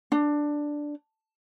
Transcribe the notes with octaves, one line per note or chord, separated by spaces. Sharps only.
D4